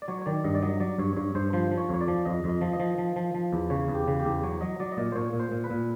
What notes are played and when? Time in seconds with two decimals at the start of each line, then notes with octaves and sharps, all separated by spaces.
0.02 D5
0.08 F#3 C#5
0.22 C#5
0.26 D#3 D5
0.44 G2 D#5
0.55 D5
0.62 F#3 D#5
0.80 F#3 D5
0.99 G2 C#5
1.17 G2 C#5
1.35 G2 C5
1.53 F3 C5
1.71 F3
1.78 C#5
1.89 F2 C#5
2.01 D5
2.08 F3
2.25 F2 D#5
2.44 F2
2.49 D#5
2.61 F3
2.73 D#5
2.80 F3
2.98 F3
3.16 F3
3.34 F3
3.53 E2
3.70 C#3 C#5
3.88 E2
3.95 G4
4.07 C#3
4.20 G4
4.25 E2
4.43 F#3 C#5
4.61 F#3 D#5
4.80 F#3 D5
4.92 D#5
4.97 A#2 D5
5.12 C5
5.15 A#2 C#5
5.33 A#2
5.40 C5
5.52 A#2
5.64 B4
5.70 A#2